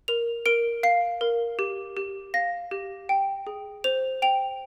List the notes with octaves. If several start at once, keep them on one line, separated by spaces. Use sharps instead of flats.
A#4 F7
A#4 D7
F5 C7
A#4
G4
G4
F5 A#6
G4
G5
G#4
C5 F7
G5 F7